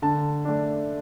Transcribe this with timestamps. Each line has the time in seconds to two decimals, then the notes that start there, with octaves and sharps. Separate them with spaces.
0.02 D3 A5
0.45 A3 D4